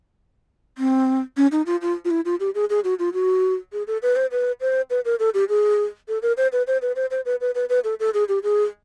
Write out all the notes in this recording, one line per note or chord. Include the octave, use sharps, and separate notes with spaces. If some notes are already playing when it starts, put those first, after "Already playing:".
C4
C#4
D#4
F4
F4
F4
E4
F4
G4
G#4
G#4
F#4
F4
F#4
G#4
A4
B4
C5
B4
C5
B4
A#4
A4
G4
G#4
A4
A#4
C5
B4
C5
B4
C5
C5
B4
B4
B4
B4
A4
A4
G#4
G4
G#4